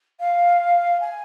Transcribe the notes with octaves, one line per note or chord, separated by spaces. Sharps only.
F5
G#5